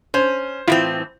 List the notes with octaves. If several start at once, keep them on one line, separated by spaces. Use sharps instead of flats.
C#4 C5
A2 E3 C4 E4 F4